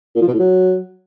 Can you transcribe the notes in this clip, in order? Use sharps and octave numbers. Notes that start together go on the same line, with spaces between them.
A#2
F3
B2
A2
F#3